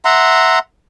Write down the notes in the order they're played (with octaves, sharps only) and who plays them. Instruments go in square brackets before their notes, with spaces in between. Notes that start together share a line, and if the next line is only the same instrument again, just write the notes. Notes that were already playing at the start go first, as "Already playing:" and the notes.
[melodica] E5 F#5 A#5 C6